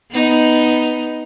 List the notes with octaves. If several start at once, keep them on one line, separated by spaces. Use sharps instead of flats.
B3 D#4